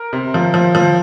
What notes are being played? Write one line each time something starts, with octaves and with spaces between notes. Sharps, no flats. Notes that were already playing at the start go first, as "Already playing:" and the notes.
Already playing: A#4
C3
F3
F3
F3